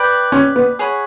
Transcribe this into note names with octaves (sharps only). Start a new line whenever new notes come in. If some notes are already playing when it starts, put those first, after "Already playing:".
Already playing: B4 D5 G5
C#4
B3
G#4 C#5 F#5 B5